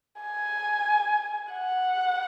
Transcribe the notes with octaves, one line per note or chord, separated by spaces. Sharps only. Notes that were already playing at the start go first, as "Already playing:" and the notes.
G#5
F#5